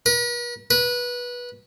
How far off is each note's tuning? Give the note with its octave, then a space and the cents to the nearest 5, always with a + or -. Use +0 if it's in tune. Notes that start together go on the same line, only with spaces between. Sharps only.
B4 -45
B4 -20